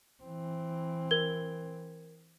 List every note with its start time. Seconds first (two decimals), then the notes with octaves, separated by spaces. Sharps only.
0.23 E3 C4
1.11 A#4 G#6 G7